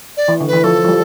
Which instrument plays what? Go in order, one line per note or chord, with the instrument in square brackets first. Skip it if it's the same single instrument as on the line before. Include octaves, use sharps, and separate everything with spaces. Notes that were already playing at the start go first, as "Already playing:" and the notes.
[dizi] D5
[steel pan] E3
D3
[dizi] B4
[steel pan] E3
[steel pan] F3 [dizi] A4
[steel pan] F3
G3